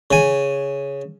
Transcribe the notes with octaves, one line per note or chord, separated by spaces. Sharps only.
C#3 G#5